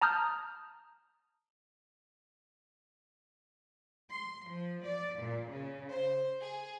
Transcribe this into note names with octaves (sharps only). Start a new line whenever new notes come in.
A5 A#5 D#6 F6 G6
C6
F3
D5
A#2
C#3
C5
G#4